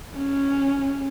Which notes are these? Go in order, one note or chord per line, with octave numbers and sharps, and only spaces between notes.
C#4